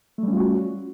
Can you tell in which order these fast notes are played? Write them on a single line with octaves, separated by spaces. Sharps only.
A3 G3 C#4 F4 F#4